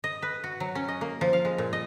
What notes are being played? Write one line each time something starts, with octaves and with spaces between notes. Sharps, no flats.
D#5
B4
F#4
F#3
C#4
D#5
A#3
F3
F5
G#3
A#2
D#5